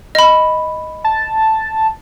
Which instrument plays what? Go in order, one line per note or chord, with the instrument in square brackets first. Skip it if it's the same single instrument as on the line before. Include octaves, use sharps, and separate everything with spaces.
[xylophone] D#5 B5
[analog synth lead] A5